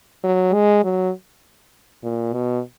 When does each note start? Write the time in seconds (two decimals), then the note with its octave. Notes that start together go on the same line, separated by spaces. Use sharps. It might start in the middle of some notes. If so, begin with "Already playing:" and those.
0.24 F#3
0.54 G#3
0.84 F#3
2.04 A#2
2.33 B2